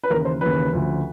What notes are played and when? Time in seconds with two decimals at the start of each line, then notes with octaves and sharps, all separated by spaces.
0.03 B4
0.10 D#2 C#3 E3 A#4
0.25 C5
0.41 D#2 C#3 E3 B4
0.73 D2 C#3 F3